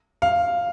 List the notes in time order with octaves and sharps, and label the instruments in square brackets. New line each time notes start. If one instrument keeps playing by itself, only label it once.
[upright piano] F5